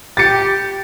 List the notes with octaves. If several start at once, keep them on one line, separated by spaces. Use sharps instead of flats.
G4 A6 C#7